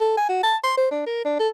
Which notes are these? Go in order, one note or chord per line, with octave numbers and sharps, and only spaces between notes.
A4
G#5
F#4
A5
C6
C5
D4
A#4
D4
A4